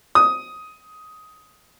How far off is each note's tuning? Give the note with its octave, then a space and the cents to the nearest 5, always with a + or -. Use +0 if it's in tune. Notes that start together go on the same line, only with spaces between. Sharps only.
D#6 +10